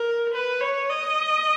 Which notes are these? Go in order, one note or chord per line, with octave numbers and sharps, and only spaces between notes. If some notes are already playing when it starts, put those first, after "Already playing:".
Already playing: A#4
B4
C#5
D#5